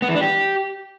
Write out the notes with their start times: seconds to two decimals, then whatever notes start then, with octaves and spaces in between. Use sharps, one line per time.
0.02 B3
0.09 E3
0.15 D4
0.21 G4